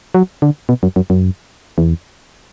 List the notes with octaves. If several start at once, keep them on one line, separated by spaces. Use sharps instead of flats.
F#3
D3
B2
F#2
F#2
F#2
E2